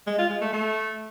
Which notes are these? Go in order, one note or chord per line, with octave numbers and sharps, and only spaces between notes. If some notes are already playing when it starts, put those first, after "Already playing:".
G#3
F4
G#3
A3
A3